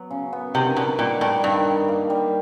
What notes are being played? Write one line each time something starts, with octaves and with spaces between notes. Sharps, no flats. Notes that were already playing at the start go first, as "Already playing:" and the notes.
Already playing: F#3 B3
C#3
B3
C3 D#3
B2 D4
A#2 G3
A2 G3
G2 D#3
D4
A#3
G3